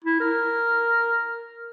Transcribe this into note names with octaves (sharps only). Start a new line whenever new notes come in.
E4
A#4